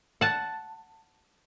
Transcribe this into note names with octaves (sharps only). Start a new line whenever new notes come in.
F#5 A5